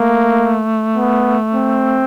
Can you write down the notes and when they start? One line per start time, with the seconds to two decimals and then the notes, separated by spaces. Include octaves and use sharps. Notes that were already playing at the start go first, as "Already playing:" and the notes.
Already playing: A3 A#3
0.96 B3
1.54 C4